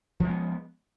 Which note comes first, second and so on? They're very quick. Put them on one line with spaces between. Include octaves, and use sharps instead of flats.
F3 G#3 B3